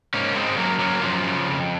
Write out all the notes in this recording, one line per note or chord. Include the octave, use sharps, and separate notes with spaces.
G#2 A#3 C#4
G#2 G#3 C4
F#2 F#3 A#3
F#2 F#3 A#3
F#2 F3
C#3
F2